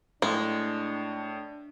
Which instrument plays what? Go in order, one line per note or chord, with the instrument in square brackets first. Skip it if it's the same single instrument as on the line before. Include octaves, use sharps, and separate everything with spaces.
[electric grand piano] A2 [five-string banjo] G#3 [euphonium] D4